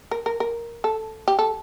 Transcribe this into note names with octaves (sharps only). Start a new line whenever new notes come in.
A#4
A#4
A#4
A4
G4
A4